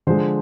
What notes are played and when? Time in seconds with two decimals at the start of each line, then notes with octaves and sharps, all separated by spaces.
0.07 D3 F3 G#3 C5